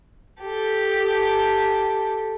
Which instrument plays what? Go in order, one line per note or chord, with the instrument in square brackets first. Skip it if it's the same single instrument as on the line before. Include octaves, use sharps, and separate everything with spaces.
[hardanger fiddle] G4 A4